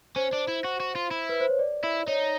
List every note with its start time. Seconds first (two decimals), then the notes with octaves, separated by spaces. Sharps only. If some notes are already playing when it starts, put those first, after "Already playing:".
0.16 C#4 C5
0.33 D4
0.48 E4
0.64 F#4
0.80 F#4
0.95 F4
1.11 E4
1.29 B4
1.40 C5
1.49 C#5
1.59 D5
1.84 E4
2.08 D#4 C#5